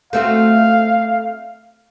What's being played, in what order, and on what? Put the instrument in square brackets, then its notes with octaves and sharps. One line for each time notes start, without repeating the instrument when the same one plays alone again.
[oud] A3 C4 F#4 [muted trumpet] F5